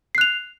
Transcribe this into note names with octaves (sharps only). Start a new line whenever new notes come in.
F#6 C7 F7